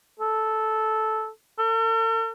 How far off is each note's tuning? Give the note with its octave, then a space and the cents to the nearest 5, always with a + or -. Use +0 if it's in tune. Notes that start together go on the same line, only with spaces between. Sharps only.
A4 -10
A4 +45